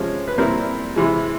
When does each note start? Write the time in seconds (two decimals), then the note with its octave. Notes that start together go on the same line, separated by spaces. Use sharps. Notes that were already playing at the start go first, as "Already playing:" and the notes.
Already playing: C3 F3 G#3 C#4
0.28 B4
0.38 A#2 G3 C4 E4 A#4
0.96 C3 E3 G#3